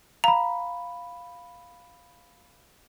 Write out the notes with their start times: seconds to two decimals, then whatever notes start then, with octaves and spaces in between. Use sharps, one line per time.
0.24 F5 A#5 B5